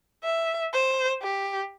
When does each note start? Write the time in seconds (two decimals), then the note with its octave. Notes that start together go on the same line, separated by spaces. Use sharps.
0.24 E5
0.74 C5
1.22 G4